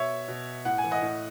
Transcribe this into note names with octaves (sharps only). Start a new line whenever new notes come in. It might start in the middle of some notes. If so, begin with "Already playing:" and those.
Already playing: B2 C#5 E5
B2
A2 F#5
G#5
E3
D#5 F#5
A2